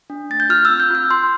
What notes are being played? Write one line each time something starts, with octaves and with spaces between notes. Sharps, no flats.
D4
A3 A6
G6
F4 F6
E6
C4
G6
F4 F6
F4 C6